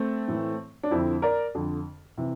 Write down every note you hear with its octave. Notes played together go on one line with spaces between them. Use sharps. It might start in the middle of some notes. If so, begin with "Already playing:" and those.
Already playing: A3 C4
A2 E3
D4
F2 D3 C4 E4
A#4 D5
F2 D3
C3 E3